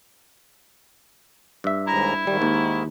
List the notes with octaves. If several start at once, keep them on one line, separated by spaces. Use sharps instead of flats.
G2 E5
D#2 G#2 E4 A#5
G#2 D#3 G3
D#2